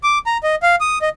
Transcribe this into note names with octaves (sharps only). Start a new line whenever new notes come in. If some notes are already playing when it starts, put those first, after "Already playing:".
D6
A#5
D#5
F5
D#6
D#5